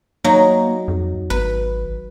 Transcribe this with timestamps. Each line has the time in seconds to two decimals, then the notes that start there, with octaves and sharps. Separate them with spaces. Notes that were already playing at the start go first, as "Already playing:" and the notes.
0.24 F#3 A#3 D#4
0.88 F2
1.30 G#1 B4